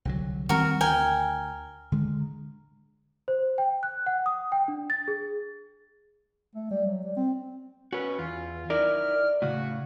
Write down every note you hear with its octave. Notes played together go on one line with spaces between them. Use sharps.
C2 D3 F#3
D#3 G3 C4 F#4 A#4
D2 A#4 G5 G#5
D3 G#3
C5
G5
F#6
F#5
D#6
G5
D4
A6
G#4
A3
G3
F#3
G3
C4
C#4 F#4 B4
E2 F4
D#4 E4 A#4 D5 F6
A2 C#3 F#4